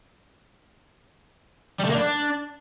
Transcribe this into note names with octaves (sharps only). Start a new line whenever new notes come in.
G3
A3
A#3
D4